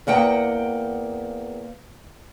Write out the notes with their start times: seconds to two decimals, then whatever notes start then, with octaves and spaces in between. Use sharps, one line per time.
0.07 E2 A#3 F#5 G5